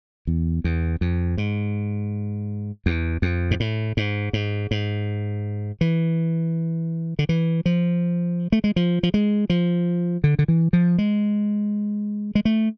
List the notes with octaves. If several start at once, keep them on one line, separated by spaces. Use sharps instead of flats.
E2
E2
F2
G#2
E2
F2
G#2
A2
G#2
G#2
G#2
E3
D3
E3
F3
A3
G#3
F3
F3
G#3
F3
D3
D3
E3
F3
G#3
G#3
A3